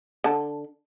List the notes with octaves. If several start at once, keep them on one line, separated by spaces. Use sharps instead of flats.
D3 A5